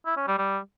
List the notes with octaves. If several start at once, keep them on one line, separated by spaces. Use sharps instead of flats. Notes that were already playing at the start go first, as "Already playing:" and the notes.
E4
C#4
G3
G3